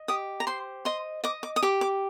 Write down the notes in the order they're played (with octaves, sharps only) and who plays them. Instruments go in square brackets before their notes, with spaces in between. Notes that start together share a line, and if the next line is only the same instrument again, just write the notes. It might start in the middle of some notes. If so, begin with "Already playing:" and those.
Already playing: [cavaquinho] D#5
G4 D#6
A#5
C5 C6
D#5 C6
D#5 D6
D6
D#6
G4 D6
D6